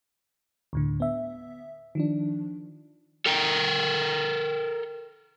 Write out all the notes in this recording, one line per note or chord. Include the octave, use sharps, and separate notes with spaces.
D2 A2 D3
B3 E5
D#3 F3 D4
A4 A#4 G5 A#5